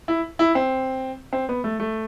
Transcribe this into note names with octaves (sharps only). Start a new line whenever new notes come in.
E4
E4
C4
C4
B3
A3
A3